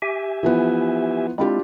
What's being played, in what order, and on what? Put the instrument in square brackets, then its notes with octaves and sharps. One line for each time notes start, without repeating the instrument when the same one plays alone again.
[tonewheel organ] G4 E5 G#5
[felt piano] E3 F3 B3
[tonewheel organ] G#3 C4 E4 [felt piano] D4 F4 G4